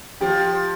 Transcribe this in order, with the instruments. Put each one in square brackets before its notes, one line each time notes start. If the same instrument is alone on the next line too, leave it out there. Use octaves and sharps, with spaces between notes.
[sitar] F3 [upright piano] G4 G5